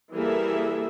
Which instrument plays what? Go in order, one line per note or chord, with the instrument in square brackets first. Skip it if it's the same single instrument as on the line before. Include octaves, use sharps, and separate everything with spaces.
[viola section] E3 G3 A#3 G#4 A4 E5